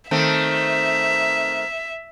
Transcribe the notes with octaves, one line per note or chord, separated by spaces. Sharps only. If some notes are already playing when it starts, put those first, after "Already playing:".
D#3 A3 C4 E5